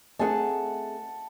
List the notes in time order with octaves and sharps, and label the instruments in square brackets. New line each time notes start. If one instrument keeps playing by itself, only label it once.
[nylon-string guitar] A3 C4 G#4 [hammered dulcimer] F#5 A5